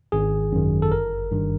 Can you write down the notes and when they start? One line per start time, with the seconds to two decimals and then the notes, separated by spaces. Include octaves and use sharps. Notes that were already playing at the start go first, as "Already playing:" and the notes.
0.12 G#1 G#4
0.52 F#2 D#3
0.82 A4
0.92 G1 A#4
1.31 G2 D#3